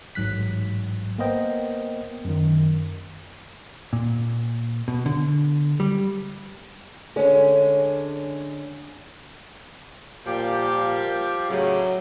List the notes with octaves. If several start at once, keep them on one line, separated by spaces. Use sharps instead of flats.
A1 G#2 F#3 F#6 B6
A#3 B3 A#4 C5 D#5 G5
F#2 D#3
A#2
B2
D3
G3
D3 G#3 C#4
A#2 F3 G3 G4
A2 C#3 F#3